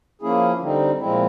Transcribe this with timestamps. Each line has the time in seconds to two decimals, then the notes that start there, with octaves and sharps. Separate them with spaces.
0.21 F3 A#3 C#4 E4 G#4
0.60 D3 G3 C4 D#4
0.99 A#2 F3 G#3 C4 E4